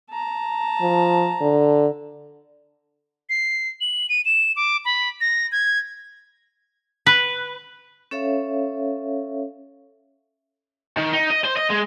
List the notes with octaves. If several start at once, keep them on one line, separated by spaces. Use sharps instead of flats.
A5 A#5
F3
D3
C7
F#7
D#7
E7
D6
B5
A#6
G#6
B4
C#4 A4 C#5 E5 F5
D#3
D#4
D#5
C5
D#5
G#3